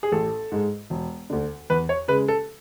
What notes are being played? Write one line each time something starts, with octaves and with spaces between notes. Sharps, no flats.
G#4
A1 A4
G#2 G#3
E1
D2 D3
E2 B4
C#5
C#3 G#3 B4
A4